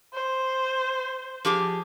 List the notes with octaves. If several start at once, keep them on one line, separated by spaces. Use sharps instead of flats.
C5
F3 G4 G#4